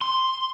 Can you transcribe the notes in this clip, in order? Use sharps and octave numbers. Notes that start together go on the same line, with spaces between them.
C6